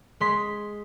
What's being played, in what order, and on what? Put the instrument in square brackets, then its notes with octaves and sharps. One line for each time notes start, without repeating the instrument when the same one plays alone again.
[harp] G#3 C6 B6